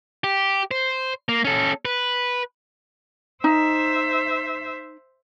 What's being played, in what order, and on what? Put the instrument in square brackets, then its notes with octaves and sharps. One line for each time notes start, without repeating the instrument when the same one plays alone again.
[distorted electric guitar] G4
C5
A#3
C#4 A4
B4
[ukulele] D#4 [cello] C5 E5